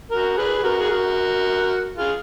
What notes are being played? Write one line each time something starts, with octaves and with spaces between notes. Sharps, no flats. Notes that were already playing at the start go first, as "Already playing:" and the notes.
F#4 A#4
G#4 B4
G#4
F#4 A#4
G#4
F#4 A#4
F4 G#4